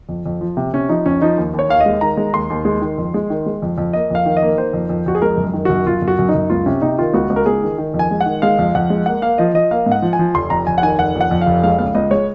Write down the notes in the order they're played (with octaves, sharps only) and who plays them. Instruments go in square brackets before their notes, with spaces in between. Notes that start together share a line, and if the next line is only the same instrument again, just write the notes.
[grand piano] F2
F2
F3
C3
C3 C#4
F3 D#4
F2 C#4
F3 D#4
D#2
D#2 C#5
D#2 F5
D#5
G#3
D#3 A#5
G#3
D#2 C6
D#2
G#3
D#3
F2
G#3
D#3
G#3
F2
F2
A#3 D#5
F2 F5
D#3
D#5
A#3
D#3 C5
F2
F2
F2 F#4
G#4
G#3 A#4
F#2
D#3
F#2 F#4
F#2 F4
F#2
F#4
F#2
D#4
F#2
C#2 F4
C3 C#4
C3 D#4
D#3 F4
C#2 F#4
C#2
A#4
C#2 G#4
D#3
D#3
F2
G#5
G#3
F#5
D#3
G#3 F5
F2
F2 F#5
G#3
A#3 F#5
A#3 F5
F3 D#5
F3 D#5
A#3 F5
G#2
F#5
F3
G#5
F3
F1 C6
F2 A#5
F1 G#5
F#5
D#3 G#5
F1 F#5
F2
F#5
F2
F5
F1
G#3 F5
C#2 F5
C#2 D#5
G#3 C#5